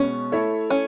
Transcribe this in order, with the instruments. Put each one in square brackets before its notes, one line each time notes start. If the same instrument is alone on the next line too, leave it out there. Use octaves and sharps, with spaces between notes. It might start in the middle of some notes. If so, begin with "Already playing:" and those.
Already playing: [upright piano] B2 G#3 B3 [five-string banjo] C#4
[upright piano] A3 E4 A4 C#5 E5
[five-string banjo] C#4